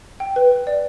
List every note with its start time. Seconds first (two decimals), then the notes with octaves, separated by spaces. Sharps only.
0.20 G5
0.36 B4
0.51 B4
0.67 D5